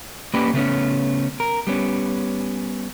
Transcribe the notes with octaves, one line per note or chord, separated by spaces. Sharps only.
A#3 C#4 G4 B4 D5
C#3 A3 B3 C#4
A#4
G3 B3 C#4